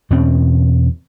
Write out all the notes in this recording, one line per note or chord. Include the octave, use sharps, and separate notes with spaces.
E2 B2 C4 C#4